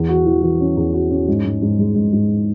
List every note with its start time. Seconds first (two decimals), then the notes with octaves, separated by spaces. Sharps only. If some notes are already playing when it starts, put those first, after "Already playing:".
Already playing: E2
0.09 F#4
0.26 E3
0.43 E3
0.60 C#4
0.77 E2
0.94 F#4
1.11 C#4
1.28 G#2
1.45 G#2
1.62 G#2
1.79 G#3
1.95 G#2
2.13 G#2